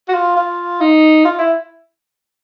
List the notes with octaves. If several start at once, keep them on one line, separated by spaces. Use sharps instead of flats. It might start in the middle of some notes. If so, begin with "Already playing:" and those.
F#4
F4
F4
D#4
F4
E4